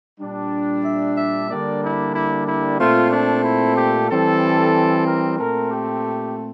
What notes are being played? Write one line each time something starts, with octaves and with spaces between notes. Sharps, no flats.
A#2 G3 D4
E5
E5
D3 G3 A#3 D4 D5
E4
E4
E4
A#2 A3 C4 F4
D4
E4
G4
E3 G3 C4 A4
A#4
A#2 A3 C4 A#4
G4